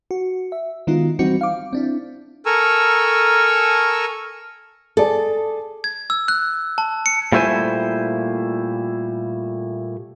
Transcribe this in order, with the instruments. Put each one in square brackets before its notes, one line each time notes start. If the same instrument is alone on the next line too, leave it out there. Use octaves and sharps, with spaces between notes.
[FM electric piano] F#4
E5
D#3 G#3 B3 D#4 F4 F#4
E3 G3 C4 D#4 F#4 C#7
F5 D6
C4 D4 E4
[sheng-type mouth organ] A4 A#4 G#5 A#5 C#6 E6
[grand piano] G#4 D5 [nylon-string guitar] A4
[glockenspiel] G#6
E6
F#6
A5
C#7
[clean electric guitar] A#2 G3 A3 E4 C5 G#5